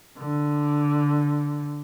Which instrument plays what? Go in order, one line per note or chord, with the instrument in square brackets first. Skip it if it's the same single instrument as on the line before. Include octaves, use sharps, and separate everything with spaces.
[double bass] D3